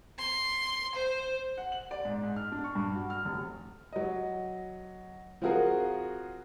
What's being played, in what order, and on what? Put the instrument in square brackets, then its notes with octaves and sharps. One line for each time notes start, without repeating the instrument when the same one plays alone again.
[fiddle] C6
C5
[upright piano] F#5
F#7
D5
G#2
G#2
F6
D4
C#6
G2
F#4
F6
F1
F#3 D#5
F3 C4 F4 F#4 G#4 A#4